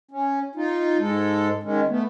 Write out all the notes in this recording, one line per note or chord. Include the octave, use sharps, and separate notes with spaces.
C#4
D#4 F4
G#2 G#3 A4
D#3 G#3 C#4
A3 B3